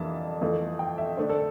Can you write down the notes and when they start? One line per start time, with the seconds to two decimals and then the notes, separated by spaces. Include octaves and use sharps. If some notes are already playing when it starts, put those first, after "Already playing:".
Already playing: F2 E3 G3 A#3 D4 E5 A5
0.41 F2 E3 A3
0.79 G5
0.98 E5
1.17 D3 A3 D4 C5
1.29 A4